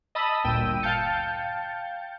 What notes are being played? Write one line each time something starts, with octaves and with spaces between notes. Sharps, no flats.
D#5 A5 B5 D#6 E6 B6
G1 D2 A#2 G5 E6 D#7
F5 G5 A5 G6 A6 C#7